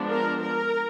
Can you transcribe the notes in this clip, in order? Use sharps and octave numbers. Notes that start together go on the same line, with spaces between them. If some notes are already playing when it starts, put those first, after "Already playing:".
Already playing: F3 G#3 B3 D4
A#4
A#4